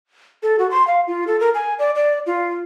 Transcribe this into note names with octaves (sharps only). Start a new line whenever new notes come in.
A4
F#4
C6
F5
F4
A4
A#4
G#5
D5
D5
F4